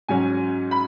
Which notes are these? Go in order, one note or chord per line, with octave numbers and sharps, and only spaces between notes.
G#2 F#3 C#4 G#5
B5